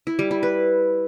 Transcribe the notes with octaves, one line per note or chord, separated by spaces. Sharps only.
E4
G3
E4
B4